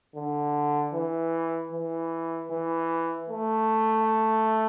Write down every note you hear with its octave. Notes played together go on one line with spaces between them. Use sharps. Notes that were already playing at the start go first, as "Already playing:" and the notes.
D3
E3
E3
E3
A3